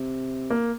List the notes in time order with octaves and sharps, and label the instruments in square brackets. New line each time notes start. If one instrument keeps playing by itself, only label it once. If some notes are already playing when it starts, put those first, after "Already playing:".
Already playing: [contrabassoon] C3
[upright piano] A#3